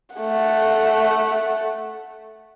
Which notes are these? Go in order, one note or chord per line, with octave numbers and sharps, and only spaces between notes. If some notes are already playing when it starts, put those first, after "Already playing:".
A3 F#5